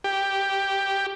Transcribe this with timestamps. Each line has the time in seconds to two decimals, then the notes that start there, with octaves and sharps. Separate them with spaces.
0.04 G4